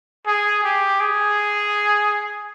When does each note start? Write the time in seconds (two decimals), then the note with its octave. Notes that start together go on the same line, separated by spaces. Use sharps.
0.27 G#4
0.64 G4
1.00 G#4